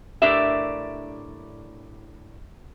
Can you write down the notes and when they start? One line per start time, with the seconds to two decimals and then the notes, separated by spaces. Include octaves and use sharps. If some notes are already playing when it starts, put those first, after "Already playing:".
0.22 A2 D4 G4 A#4 D5 E5